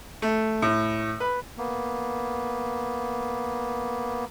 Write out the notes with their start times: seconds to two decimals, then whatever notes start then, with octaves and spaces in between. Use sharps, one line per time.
0.22 A3
0.62 A2
1.20 B4
1.58 A#3 B3